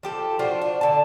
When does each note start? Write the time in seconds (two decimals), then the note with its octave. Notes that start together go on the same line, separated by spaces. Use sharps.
0.03 F3 G4 A4
0.39 D4 F4 F#4 C5
0.61 D4
0.81 D3 A5